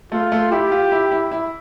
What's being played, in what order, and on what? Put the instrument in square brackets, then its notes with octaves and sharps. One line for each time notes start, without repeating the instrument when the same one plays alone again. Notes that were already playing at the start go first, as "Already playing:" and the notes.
[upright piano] A3 [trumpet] F4
[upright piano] A3
[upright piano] E4 [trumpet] G4
[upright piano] F4
E4
E4
E4